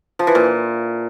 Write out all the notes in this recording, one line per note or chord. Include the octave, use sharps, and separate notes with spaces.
F3
E3
A#2